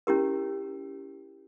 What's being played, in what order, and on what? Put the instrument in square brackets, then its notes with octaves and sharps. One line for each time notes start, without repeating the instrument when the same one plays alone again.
[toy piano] C#4 E4 G4 A#4